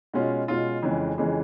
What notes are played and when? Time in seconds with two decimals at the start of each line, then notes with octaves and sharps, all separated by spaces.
0.13 B2 G#3 C#4 F4
0.48 B2 G#3 C#4 F4
0.82 F2 C#3 E3 G#3
1.18 F2 C#3 E3 G#3